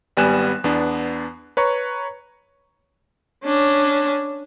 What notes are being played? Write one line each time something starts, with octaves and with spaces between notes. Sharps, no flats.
G#1 G3 B3 G#5 F#6 E7
E2 B3 D4
B4 C#5 A#5 C#6
C#4 D4